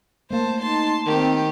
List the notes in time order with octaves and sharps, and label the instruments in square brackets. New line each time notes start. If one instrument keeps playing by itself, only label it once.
[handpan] A3 A#3 [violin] C5 A5
[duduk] D#4 [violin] A5 C6
[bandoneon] D#3 [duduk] C4 [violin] G4